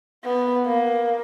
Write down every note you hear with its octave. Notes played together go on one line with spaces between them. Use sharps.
B3
A#3